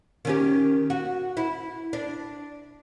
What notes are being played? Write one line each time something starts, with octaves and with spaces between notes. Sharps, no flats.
D#3 C#4 G4
F#4
E4
D4